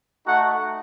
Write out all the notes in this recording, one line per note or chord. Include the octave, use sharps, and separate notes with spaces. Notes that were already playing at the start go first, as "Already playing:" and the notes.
A3 D#4 F#4 F#5